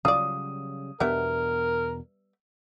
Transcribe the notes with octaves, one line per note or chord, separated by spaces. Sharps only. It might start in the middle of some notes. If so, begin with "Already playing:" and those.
C#3 F#3 G3 F4 D5 D#6
E2 B2 G3 B3 D4 A#4 E5